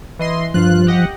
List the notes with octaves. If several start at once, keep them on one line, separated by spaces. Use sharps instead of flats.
E3 D#5 C6
G2 F3 F4 F#6
G4 D#5 F#5